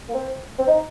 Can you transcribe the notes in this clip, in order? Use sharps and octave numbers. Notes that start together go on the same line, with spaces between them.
A#3
C4
C4
D#4